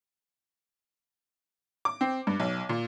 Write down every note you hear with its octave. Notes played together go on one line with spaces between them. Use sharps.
D6
C4
G2
B1
A#2